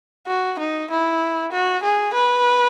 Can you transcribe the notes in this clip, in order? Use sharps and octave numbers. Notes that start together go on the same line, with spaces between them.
F#4
D#4
E4
F#4
G#4
B4